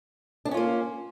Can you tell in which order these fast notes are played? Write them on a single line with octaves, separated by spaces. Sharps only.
D4 B3 C#4 F4 A#3